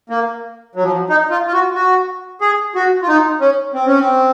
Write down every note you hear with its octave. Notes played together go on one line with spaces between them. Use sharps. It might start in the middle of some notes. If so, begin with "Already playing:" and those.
A#3
F#3
F3
F#3
D#4
F4
F4
F#4
F#4
G#4
F#4
F4
D#4
C#4
C4
C#4
C4